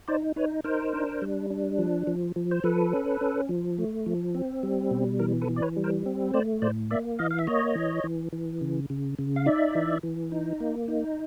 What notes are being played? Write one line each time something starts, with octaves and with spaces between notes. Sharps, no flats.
D#4 C5 D5
D#4 B4 C#5
D#4 A#4 C5
D4
G3
D4
F3
F3
F3
C5
F3 A4 B4
C#4
C#4
F3
A3
F3
C4
G3
B2
E3 A#4
A4 B4
E3
D5
B4 C#5
G3
A#4 C5
C4
A3 C5 D5
A2 C5 D5
A#3 D5 E5
E3 D#5 F5
F5
E5
A#3 C#5 D#5
E3
E3
E3
C#3
C#3
C#3
F5
D#4 D5 E5
E3
E3
D#4
A#3
D#4